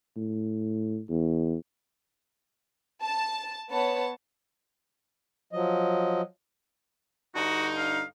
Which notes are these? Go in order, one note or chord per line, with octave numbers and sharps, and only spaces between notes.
A2
E2
A5
B3 C#5 A5
F3 F#3 D#5
G2 D3 D#4 F#4
F5